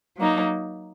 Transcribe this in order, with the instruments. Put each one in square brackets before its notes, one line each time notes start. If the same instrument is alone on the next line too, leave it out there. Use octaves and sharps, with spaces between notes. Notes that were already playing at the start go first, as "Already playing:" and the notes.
[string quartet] F#3 A#3 D#4